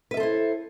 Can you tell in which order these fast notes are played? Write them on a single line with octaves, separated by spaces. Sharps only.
B4 E5 A4 C5 E4